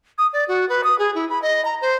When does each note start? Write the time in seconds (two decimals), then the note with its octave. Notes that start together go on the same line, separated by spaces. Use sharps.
0.18 D#6
0.33 D5
0.48 F#4
0.69 B4
0.84 D#6
0.99 G#4
1.15 E4
1.30 B5
1.42 D#5
1.65 A#5
1.81 C5